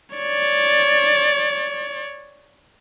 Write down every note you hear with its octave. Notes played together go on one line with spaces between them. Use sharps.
C#5 D5